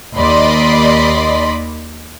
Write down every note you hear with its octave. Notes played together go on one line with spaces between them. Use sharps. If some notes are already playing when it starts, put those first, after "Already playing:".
D#2 D5 D#5 B5 C6